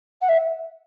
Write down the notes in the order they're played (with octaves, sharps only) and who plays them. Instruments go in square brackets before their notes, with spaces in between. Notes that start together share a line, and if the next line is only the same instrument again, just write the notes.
[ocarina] F#5
E5